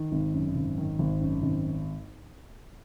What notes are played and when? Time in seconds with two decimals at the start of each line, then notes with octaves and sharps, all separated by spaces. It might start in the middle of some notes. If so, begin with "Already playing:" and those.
Already playing: D#3
0.12 G#1
0.34 F#2
0.55 G#1
0.78 D#3
0.99 G#1
1.21 F#2
1.43 G#1